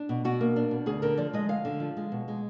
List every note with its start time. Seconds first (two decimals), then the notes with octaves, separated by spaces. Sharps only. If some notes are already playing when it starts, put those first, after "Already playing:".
Already playing: D4
0.09 B2
0.25 B2 F#4
0.41 A#3
0.56 D4
0.71 B2
0.86 D2 G#4
1.02 D3 A#4
1.17 F3 D5
1.33 G#3 D#5
1.49 D2 F5
1.65 D3
1.80 F3
1.97 G#3
2.12 B2
2.28 G#3